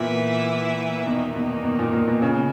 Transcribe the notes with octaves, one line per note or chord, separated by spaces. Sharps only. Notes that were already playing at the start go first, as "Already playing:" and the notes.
Already playing: A#2 E3 B3 E4 B4 E5
E2 B2 D#3 A#3 D#4
B2
B2
A#2
A#2
B2
C#3